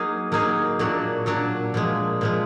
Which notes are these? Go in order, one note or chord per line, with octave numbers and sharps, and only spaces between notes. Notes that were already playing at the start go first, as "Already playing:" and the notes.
Already playing: F#3 A#3 D#4 G#4
F#3 A#3 D#4 G#4
A#2 F#3 D4 F#4
A#2 F#3 D4 F#4
A#2 F3 G#3
A#2 F3 G#3